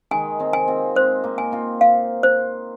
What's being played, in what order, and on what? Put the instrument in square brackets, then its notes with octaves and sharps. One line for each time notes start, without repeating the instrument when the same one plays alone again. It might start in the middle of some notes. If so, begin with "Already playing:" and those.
[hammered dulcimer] D#3 G#3 [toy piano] G#5
[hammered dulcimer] G#3 C4
[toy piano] G#5
[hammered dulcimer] C4 F4
[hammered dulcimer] G#3 C4 [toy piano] C5
[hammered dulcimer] A#3 D#4
[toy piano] G#5
[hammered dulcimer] C4 F4
[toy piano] F5
C5